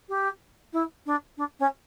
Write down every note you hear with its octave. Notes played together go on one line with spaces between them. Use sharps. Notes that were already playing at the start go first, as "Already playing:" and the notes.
G4
E4
D4
D4
C#4